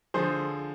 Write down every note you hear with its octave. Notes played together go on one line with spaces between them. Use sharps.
D3 F3 G#4 C5